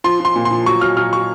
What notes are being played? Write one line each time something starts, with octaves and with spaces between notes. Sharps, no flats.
F3 C6
F3
C6
A#2
C6
F3
F#3 C#6
F#3 F6
F#3 F6
F#3 C#6